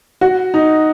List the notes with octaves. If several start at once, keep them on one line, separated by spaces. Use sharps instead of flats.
F#4
D#4